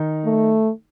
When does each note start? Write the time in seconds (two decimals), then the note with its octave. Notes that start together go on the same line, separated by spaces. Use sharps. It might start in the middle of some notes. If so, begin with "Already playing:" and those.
Already playing: D#3 D#4
0.25 A3